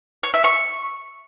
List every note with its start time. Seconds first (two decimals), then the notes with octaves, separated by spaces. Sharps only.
0.23 C#5
0.34 E5
0.44 C#6